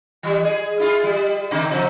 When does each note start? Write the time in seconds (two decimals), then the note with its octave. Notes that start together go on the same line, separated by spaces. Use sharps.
0.23 E3 G3
0.45 G#4
0.79 E4 F4 G#4
1.04 G3
1.51 C3 D#3 A#3
1.71 C3 F3 F#3